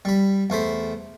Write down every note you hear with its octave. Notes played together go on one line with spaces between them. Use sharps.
G3 B5
E2 A3 C5 B5